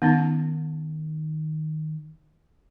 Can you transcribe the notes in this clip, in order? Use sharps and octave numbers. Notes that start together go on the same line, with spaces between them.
D#3 B3 C#4 D#4